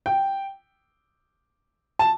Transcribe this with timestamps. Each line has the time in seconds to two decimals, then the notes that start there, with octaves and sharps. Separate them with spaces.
0.06 G5
1.99 A5